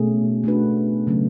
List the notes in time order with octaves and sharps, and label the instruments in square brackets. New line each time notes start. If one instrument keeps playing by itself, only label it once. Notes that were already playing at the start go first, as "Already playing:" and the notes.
Already playing: [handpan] B2 A3 C#4 G#4
A3 D4 F#4 B4
C#3 F#3 A3 C#4